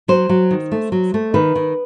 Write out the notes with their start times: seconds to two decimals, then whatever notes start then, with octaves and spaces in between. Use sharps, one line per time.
0.08 F#3 C5
0.29 F#3
0.51 D#3
0.72 A3
0.92 F#3
1.14 A3
1.34 D#3 B4
1.55 D#3